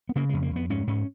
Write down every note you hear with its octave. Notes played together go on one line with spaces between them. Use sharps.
B3
C#3 A#3
F2 G#3
A#3
F2 B3
G#2 C#4
G#2 C#4